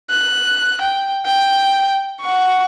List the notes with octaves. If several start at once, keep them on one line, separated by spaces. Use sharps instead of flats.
F#6
G5
G5
F#5 C#6